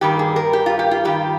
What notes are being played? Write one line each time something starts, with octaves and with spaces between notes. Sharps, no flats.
G2 D#3 G3 A#3 G4
G#4
A#4
G4
F4
G4
F4
G2 D#3 G3 G4